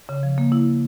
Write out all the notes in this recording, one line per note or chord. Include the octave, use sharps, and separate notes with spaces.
C#3
F3
A#3
E4